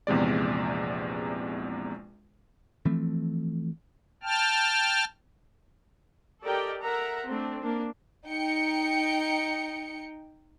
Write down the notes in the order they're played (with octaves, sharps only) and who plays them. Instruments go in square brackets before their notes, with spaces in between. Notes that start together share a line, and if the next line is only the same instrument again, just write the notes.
[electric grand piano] A#1 E2 C3 G#3 D5
[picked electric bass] E3 F3 A3 C4
[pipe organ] G5 A5 F6
[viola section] G4 A4 A#4 D5 D#5 G5
A#4 E5 F#5 A#5
A3 C4 D4
A#3 D4
[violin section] D#4 G5 C#7